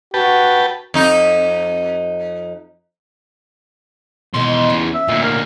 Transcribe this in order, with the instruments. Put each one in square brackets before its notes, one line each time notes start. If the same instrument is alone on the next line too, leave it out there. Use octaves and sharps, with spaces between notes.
[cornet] F#4 [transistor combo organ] B4 G5 A5
[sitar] F2 D#4
[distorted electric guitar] E2 C6 [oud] B2 D#3 G#3
[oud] C#4
[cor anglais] E5
[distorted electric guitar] D2 A#2 [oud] D#4
[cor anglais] A#4